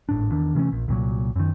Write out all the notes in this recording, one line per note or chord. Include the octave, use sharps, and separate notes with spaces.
G#1 A2 D4
E2 D#3 D4
C3 E3 A3 C#4
A#1
C2 A#2 F#3
F#2 D#3